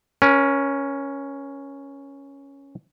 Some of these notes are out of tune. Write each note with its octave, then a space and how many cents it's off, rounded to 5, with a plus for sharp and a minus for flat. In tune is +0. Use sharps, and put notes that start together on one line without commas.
C#4 +0 A#4 +40